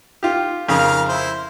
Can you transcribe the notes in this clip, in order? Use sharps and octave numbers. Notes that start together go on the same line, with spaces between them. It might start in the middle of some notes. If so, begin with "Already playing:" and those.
F4 G4
F2 C#3 A#4 F5 D#6
E4 C5